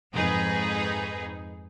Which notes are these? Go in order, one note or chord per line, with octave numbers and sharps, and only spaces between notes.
F2 G#2 D#4 G#4 B4